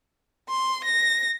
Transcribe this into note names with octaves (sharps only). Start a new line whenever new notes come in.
C6
A#6